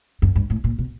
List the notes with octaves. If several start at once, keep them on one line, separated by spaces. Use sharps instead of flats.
F#2
G2
A2
A#2
B2